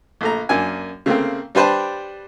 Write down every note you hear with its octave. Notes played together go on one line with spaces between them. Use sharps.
A#1 A3 A#5
F#2 A#3 D4 G#5
C#3 A3 A#3 C4
G3 D4 B4 C5 G5 A5